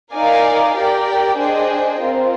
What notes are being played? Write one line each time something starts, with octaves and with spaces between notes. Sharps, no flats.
D#4 A#4 D5 F5 G#5
G4 A#4 D5 G5
D4 G#4 C5 D#5 G5
C4 F4 A#4